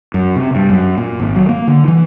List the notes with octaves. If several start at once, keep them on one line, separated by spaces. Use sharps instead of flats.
F#2
C3
G2
F#2
A#2
G#1
F#3
A#3
D3
E3